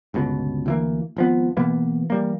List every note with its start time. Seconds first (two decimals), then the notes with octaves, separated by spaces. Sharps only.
0.14 G1 C#2 B2
0.66 D2 E3 A#3
1.17 G#1 F3 B3
1.57 B2 E3 A#3 B3
2.10 E3 G3 A#3